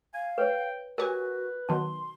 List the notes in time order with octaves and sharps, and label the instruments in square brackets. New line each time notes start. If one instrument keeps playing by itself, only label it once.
[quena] F5 [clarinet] G#5
[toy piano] B4 C#5 [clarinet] G5
[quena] F#4 [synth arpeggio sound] G4 C#5 G#5 [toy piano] A#4 [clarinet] B4
[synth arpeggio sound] B2 D#3 F#3 [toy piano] A5 [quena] C6